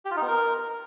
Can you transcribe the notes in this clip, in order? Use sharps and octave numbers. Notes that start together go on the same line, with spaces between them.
G4
F4
D#4
B3
A#4